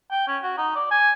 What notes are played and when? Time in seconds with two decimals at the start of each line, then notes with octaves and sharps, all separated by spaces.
0.11 G5
0.27 C#4
0.43 F#4
0.58 D#4
0.76 D5
0.91 G#5